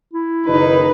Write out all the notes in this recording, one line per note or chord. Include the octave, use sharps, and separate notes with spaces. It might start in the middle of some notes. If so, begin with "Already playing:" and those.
E4
F#1 D#3 D#4 B4